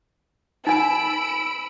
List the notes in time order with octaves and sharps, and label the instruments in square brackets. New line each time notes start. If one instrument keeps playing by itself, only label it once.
[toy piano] D#4 G#5 [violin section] B5 E6 D7